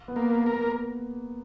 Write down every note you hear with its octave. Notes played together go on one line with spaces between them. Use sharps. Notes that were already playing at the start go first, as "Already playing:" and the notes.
B3
A#3
B3
A#4
A#3